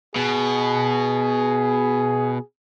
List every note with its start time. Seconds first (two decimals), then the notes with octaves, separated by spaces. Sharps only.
0.16 B2 G#4